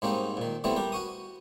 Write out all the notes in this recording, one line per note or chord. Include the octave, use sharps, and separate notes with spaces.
G#2 G3 A#3 C4 C#4 D#4
A#2 D#3
D3 E3 G3 A3 B3 C4
G3 G4 A#4
F#4 C#6 D#6